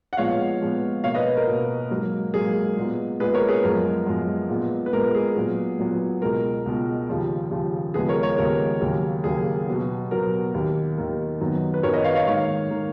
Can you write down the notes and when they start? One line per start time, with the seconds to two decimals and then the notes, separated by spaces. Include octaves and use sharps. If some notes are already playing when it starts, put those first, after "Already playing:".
0.13 F#5
0.17 A#2 F3 G#3 B3 C#5 F5
0.61 A#2 F3 G#3 B3
1.04 B2 A#3 C#5 F5
1.15 B4 D#5
1.37 A#4
1.48 B2 A#3
1.90 G#2 F#3 A#3
2.34 G#2 F#3 A#3 G#4
2.77 A#2 G#3 B3
3.20 A#2 G#3 B3 G#4 B4
3.34 A#4 C#5
3.49 G#4 B4
3.64 F#2 F3 G#3 B3 A#4
4.06 F#2 F3 G#3 B3
4.49 A#2 G#3 B3
4.86 B4
4.93 A#2 G#3 B3 A#4
5.15 G#4
5.36 A#2 F#3 B3
5.79 A#2 F#3 B3
6.22 C#2 B2 G#3 A#4
6.66 C#2 B2 G#3
7.09 D#2 C#3 F3
7.51 D#2 C#3 F3
7.94 D#2 C#3 F3 G#3 B3 G#4 B4
8.09 A#4 C#5
8.23 A#4 C#5
8.38 D#2 C#3 F3 G#3 B3 A#4
8.81 D#2 C#3 F#3 A#3
9.24 D#2 C#3 F#3 A#3 G#4
9.67 B2 F#3 B3
10.11 B2 F#3 B3 A#4
10.54 D#2 D#3 A#3
10.98 D#2 D#3 A#3
11.41 F#2 D#3 F#3 B3
11.74 B4
11.83 F#2 D#3 F#3 B3 A#4 C#5
11.94 B4 D#5
12.04 C#5 F5
12.15 C#5 F5
12.26 G#2 D#3 A#3 C#5 F5
12.70 D#3 A#3